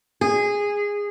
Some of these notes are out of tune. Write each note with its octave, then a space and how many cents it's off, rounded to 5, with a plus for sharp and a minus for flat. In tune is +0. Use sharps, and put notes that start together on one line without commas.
G#4 -15